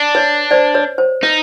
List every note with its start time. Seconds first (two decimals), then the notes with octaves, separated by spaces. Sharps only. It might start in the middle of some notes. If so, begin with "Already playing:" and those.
Already playing: D4
0.15 B4 C#5
0.51 C5 D5
0.75 B4 C#5
0.98 C5
1.23 D#4 B4